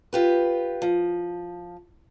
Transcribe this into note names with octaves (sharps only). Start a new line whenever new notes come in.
F4 G4 B4
F3